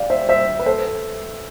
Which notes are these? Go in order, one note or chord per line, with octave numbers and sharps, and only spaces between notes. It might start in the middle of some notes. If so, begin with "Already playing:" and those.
Already playing: D5 F5 G5
C5 E5
C5 E5
B4
A4 C5